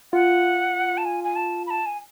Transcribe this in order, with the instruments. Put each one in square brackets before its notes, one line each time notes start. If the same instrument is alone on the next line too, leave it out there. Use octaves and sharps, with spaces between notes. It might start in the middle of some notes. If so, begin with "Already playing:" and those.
[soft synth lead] F4 [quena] F#5
[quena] A5
G#5
G#5
A5
B5
A5
G#5